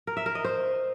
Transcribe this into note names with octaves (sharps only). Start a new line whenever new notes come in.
A#4
E5
A#4
D#5
C5